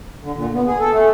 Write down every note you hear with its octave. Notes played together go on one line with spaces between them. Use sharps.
D3
A#2
B3
G#4
A4
A3